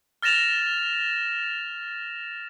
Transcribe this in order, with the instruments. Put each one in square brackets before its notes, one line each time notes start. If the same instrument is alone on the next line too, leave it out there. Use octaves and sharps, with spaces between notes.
[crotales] F6 A6 A#6 E7 F7